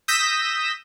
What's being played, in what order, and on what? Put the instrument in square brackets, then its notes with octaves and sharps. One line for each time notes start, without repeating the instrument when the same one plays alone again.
[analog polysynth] D#6 E6 G6 A#6 B6 E7